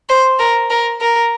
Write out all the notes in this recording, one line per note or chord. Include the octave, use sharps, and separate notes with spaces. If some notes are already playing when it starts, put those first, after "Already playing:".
C5
A#4
A#4
A#4